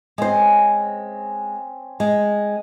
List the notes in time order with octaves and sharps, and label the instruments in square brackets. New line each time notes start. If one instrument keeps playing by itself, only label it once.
[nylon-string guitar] G#3 C5 [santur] C4 C#4 D#6
[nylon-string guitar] G#3